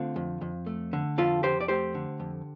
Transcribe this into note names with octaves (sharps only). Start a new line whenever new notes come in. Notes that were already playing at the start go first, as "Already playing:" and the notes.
Already playing: D3 A3 C4 F4
F2
F2
A3
D3
F2 F4 A4
F2 G4 C5
D5
A3 G4 C5
D3
F2